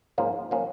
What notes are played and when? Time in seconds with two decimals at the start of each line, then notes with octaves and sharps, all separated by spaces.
0.18 G#2 F3 A#3 C#4
0.51 F3 A#3 C#4